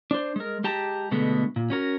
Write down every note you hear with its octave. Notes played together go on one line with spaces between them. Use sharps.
D4 C5
G#3 A#4
G#3 G4 A5 A#5
B2 D3 G#3 A3 B3
A#2
C#4 F#4 A#4